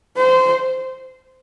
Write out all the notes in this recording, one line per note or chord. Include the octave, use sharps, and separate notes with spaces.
C5